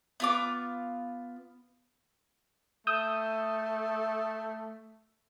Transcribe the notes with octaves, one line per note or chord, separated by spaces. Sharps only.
B3 F4 D6
A3 D#6 E6 G6